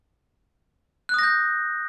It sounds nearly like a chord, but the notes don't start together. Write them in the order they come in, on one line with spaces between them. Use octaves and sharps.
F#6 D#6 A#6 G6